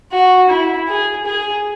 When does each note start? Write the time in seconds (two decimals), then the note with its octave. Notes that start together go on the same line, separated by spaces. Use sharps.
0.12 F#4
0.49 E4
0.88 G#4
1.26 G#4